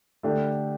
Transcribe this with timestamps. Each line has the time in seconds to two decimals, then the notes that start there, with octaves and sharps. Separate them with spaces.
0.23 D3 A3 D4 G4